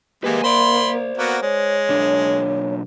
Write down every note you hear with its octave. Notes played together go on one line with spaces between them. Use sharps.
G3 G#3 A#3 B4 G#5
C5 D5 B5 C6
A#3 B3 F#4
G#3 C#5
B1 D4